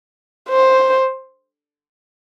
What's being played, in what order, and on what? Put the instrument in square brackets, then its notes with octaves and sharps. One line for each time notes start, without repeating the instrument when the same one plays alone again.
[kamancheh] C5